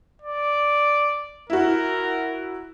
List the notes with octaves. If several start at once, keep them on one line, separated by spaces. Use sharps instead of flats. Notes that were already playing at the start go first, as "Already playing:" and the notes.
D5
E4 F#4 A#4